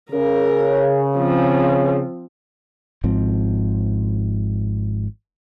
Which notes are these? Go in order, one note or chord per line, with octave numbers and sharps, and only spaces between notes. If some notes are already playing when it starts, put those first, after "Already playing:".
C#3 A#4
F3 C4
G#1 G#2 F3 C4